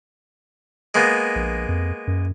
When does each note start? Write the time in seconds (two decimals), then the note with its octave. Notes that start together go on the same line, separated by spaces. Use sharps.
0.94 G#3 A#3 B3
1.35 A#1
1.68 F2
2.07 F#2